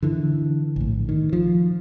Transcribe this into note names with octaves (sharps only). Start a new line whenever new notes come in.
D3 E3
A#1 A2
D#3
F3